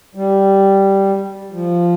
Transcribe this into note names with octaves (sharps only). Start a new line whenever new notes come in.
G3
F3